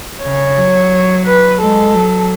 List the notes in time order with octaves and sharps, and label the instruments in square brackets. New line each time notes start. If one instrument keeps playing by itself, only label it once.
[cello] C#3 [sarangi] C#5
[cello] F#3
[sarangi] B4
[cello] G#3 [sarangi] A4
[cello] F#3